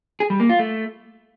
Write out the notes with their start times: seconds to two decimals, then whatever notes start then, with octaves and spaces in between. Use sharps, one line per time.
0.20 G#4
0.30 G3
0.40 A#3
0.49 F4
0.59 A3